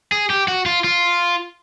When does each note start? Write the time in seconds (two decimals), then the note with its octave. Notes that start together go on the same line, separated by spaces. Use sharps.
0.12 G#4
0.30 G4
0.48 F#4
0.66 F4
0.84 F4